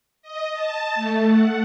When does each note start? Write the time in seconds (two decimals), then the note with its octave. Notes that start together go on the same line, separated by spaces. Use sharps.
0.22 D#5
0.53 A5
0.95 A3
1.28 F#5